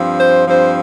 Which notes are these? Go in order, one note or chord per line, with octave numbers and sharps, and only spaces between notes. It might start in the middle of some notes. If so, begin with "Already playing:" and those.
Already playing: G2 F3 C4
C5
G2 F3 C4 C5